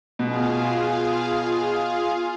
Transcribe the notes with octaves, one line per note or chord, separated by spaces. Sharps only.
B2 F4 G#4 F5